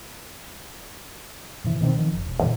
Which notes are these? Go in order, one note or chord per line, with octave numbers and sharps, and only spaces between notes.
G#2 C3 E3
B2 D#3 G#3 C4
D#3 F3
F#1
E1
A#2 C#3 E3 G3